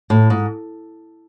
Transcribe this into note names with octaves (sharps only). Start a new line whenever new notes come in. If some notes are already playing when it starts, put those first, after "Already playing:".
A2
G#2